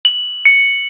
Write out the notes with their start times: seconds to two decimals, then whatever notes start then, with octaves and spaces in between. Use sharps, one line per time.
0.05 F#7
0.45 C#7